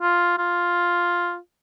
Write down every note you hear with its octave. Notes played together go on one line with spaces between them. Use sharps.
F4
F4